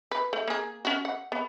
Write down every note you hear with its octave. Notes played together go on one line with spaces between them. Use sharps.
B4
A3
A#3 G#4
C#4 F#4
F#5
B3